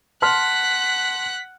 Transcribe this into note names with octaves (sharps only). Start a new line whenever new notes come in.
F#5 A5 C6 F6 F#6 B6